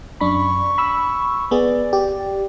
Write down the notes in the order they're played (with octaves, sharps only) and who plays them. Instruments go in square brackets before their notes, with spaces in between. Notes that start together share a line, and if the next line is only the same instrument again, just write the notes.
[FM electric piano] F#2 D4 B5 [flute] C#6
[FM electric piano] B5 E6
[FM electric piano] B3 G#4 [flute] D5
[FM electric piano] G4